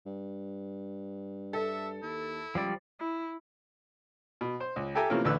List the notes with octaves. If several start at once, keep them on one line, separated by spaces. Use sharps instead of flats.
G2
A4 E5
D#2 E4
C#2 F3 G3 D5
E4
B2
C5
C#2
G4 A4 E5 G5 G#5 A#5
C3 E3 F3 A3 A#3 C#4
A1 D2 D3 A3 B4 E6